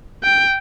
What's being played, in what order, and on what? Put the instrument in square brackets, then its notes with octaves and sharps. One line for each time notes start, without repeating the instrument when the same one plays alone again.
[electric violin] G5